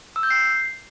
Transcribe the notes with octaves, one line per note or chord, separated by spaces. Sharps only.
E6
G6
C7